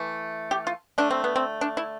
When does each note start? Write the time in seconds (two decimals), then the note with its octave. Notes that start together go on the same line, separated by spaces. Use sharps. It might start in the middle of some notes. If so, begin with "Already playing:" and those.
Already playing: E3 A3
0.51 G4
0.67 F4
0.98 D3 A3 D4
1.11 C4
1.24 B3
1.36 C4
1.61 D4
1.77 E4